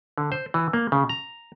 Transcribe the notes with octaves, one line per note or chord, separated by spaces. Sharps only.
D3
C5
E3
A#3
C#3
A#5